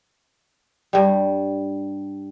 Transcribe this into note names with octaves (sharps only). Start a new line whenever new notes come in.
G2 G3